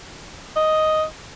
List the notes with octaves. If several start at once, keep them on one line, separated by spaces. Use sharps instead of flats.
D#5